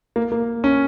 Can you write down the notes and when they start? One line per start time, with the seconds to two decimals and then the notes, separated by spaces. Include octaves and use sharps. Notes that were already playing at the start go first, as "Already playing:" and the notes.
0.16 A#3
0.32 A#3
0.64 C#4